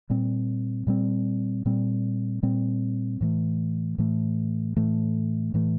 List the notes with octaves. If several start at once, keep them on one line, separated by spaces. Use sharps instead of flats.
A#2 G3 C4
A#2 G3 C4
A#2 G3 C4
A#2 G3 C4
A2 E3 A3
A2 E3 A3
A2 E3 A3
A2 E3 A3